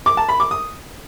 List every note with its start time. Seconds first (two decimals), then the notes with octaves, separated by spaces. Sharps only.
0.06 D6
0.17 A5
0.29 B5
0.40 D6
0.51 D#6